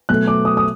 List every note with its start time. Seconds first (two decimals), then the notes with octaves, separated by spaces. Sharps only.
0.09 B2 F#3 A3 F#6
0.28 D6
0.45 D#6
0.57 D#6